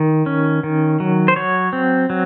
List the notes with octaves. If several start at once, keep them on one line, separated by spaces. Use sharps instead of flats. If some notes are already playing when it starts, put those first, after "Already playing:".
Already playing: D#3
C#4
D#3
F#3
C5
F#3 C#5
C4
F#3